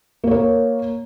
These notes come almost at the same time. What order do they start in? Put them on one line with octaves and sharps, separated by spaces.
A#3 C#5 A#4